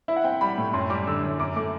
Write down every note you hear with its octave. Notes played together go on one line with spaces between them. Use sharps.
E4 E5
F#5
C4 G5
G3 B5
A2
F#2 C6
G3 D6
D3 E6
F#2
F#2 D6
A3 D6